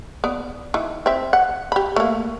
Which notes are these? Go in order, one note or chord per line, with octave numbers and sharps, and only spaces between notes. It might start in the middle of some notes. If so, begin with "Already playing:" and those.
B3 D5
D#3 E3
C4 E5
F#5
G4 B5
A3 A#3